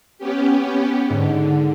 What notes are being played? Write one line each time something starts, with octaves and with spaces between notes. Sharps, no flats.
B3 C#4 G4
G#2 D3